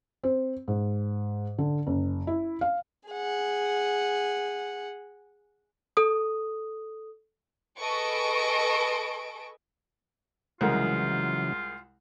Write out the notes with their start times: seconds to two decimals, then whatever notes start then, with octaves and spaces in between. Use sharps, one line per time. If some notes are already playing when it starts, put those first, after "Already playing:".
0.23 C4
0.68 G#2
1.58 D3
1.87 F#1
2.27 E4
2.61 F5
3.09 G#4 F#5
5.97 A4 D#6
7.80 G#4 A4 B4 D#5 C#6 D7
10.61 C2 C#3 E3 F#3 G#3 F4 A#4